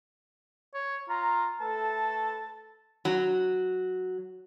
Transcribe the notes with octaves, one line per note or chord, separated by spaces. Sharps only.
C#5
F4 A#5
A3 A4 B4 A5
F#3